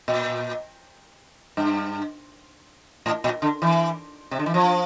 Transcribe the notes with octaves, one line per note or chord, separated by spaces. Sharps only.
A#2
G2
A2
A#2
D3
E3
C3
D3
E3
F3